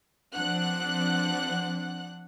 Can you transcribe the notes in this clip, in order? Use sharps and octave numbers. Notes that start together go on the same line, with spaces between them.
F3 C4 D4 F#5 F#6